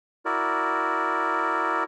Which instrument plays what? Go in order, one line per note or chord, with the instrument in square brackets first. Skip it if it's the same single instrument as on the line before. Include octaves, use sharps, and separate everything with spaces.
[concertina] E4 F#4 A#4 D5